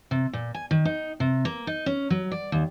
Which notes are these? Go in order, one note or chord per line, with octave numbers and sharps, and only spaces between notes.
C3
A#2
G#5
D#3
D#4
C3
A#3
D#4
C#4
F#3
D5
D#2